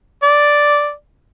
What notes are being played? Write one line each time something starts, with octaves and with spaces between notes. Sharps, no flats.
D5